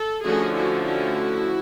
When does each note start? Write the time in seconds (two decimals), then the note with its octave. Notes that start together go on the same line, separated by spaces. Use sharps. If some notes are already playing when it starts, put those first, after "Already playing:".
Already playing: A4
0.23 D3 F3 A3 C#4 F#4 G#4
0.54 E4 F#4
0.83 E4 F#4